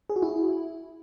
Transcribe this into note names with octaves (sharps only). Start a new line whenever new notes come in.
G#4
F#4
E4